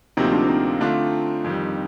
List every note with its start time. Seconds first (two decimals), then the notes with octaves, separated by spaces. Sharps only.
0.17 D2 C3 F3 A#3 C4 D#4
0.33 D4 F4
0.49 C4 D#4
0.81 D3 A3 D4 F4
1.44 F2 D#3 G3